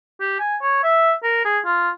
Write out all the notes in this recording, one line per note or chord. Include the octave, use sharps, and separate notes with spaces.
G4
G#5
C#5
E5
A#4
G#4
F4